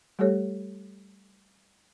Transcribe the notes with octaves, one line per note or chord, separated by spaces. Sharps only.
G3 A3 G4 A4 C#5